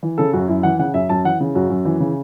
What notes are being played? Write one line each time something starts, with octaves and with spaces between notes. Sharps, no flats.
E3
C#3 A4
F#2 F#4
F#2 E4
E3 F#5
C#3 F#5
F#2 E5
F#2 A5
E3 F#5
C#3
F#2 F#4
F#2
E3
C#3